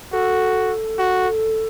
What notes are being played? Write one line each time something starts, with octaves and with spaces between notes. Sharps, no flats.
F#4 A4
F#4